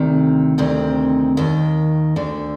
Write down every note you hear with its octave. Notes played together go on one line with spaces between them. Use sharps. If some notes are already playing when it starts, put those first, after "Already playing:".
Already playing: D2 C3 D#3
D2 C3 D#3 C4
D#2 D#3
D2 D3